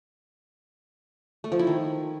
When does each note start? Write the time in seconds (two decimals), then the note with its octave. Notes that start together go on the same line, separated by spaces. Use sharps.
1.44 A3
1.52 F3
1.59 E4
1.67 D#3